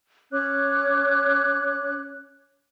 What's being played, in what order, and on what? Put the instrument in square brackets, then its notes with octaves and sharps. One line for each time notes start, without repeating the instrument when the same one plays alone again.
[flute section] C#4 C#5 D6 F#6